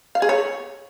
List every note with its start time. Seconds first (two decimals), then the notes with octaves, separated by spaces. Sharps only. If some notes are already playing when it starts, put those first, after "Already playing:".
0.15 F5
0.22 G#4
0.29 C#5